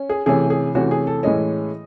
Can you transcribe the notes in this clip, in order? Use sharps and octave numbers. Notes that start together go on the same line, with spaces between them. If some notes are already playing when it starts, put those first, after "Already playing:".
Already playing: C#4
G#4
C3 E3 A3 C#4 G#4
G#4
C3 E3 A3 C#4 F#4
G#4
A4
A2 E3 G#3 C#4 D#5